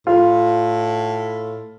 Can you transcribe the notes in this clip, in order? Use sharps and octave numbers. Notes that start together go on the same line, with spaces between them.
A2 F4